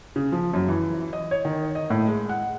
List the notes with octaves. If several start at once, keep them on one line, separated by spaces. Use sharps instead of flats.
C#3
F3
F#2
E3
D#5
C#5
D#3
D#5
A2
G#3
F#5